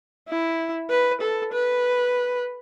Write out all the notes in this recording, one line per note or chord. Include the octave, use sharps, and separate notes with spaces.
E4
B4
A4
B4